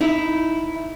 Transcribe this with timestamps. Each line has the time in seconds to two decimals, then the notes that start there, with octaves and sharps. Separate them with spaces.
0.01 D#4 E4